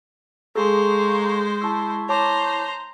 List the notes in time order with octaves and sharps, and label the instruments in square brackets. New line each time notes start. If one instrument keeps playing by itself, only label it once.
[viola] G#3 C5 [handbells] G#4 A4 [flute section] F5 A#5 C#6
[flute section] E4 C#6 [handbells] A5 E6
[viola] C5 A#5 [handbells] C#5 A5 D6